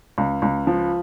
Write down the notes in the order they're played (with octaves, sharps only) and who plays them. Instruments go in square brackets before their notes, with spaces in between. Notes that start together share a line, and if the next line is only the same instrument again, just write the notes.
[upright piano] C#2
C#2
F3